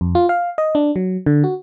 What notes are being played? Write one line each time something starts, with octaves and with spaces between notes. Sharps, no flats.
F2
F4
F5
D#5
D4
F#3
D3
F#4